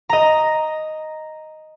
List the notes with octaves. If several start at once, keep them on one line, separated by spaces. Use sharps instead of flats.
D#5 A#5